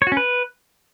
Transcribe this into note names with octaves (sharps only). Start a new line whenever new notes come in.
C#5
F#4
C#4
B4